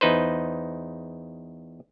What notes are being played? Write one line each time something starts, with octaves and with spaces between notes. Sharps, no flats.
E2 D#4 B4 C5